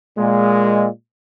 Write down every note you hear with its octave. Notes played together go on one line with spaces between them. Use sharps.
A#2 G#3